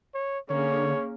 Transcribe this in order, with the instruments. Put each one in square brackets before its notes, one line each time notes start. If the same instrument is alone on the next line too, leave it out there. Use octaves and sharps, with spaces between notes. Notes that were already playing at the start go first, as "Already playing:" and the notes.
[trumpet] C#5
[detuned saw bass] D3 [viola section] A#3 C#4 G#4 [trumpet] C#5